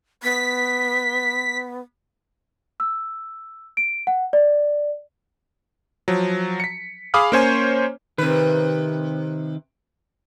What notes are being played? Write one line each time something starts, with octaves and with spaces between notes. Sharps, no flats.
B3 B6
E6
D7
F#5
D5
F3 F#3
B6 C#7
G#4 F5 B5 D6 D#6 F6
A#3 C#4 C5 C#5 G#5
C3 D#3 B4